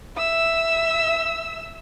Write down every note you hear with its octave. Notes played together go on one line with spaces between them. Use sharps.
E5 E6